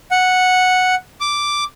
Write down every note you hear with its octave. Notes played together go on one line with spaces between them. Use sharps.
F#5
D6